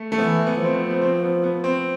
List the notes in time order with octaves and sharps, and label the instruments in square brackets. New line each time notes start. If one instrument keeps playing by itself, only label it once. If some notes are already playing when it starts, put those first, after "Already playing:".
Already playing: [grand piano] A3
A3
[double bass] E3 [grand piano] B3
[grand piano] B3
[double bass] F3 [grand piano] C4
[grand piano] B3
B3
C4
B3
B3
C4